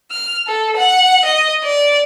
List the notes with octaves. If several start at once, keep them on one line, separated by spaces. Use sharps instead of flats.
F6
A4
F#5
D#5
D5